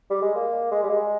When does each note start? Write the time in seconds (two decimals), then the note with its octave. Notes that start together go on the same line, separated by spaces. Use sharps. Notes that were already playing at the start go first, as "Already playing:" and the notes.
0.10 G3
0.22 G#3
0.35 A#3
0.71 G#3
0.83 G3
0.89 G#3